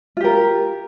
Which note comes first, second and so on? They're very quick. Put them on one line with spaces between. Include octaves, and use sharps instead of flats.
F4 G4 A#4